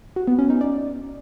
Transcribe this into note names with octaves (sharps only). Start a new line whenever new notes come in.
F#4
B3
C#4
D#4
D5